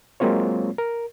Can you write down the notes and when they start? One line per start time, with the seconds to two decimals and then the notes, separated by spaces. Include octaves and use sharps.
0.20 F#3 G#3 A#3 C4 F4 C#5
0.78 A#4